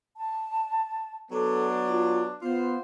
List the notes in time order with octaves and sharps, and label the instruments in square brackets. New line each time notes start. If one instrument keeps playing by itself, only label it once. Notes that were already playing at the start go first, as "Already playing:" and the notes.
[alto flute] A5
[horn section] F#3 B3 D4 [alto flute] A4
[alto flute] F4
[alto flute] B3 [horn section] F4 C5